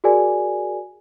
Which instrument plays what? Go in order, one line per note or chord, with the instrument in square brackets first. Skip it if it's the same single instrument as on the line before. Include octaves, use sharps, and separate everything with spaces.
[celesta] F#4 G#4 A#4 D5 G#5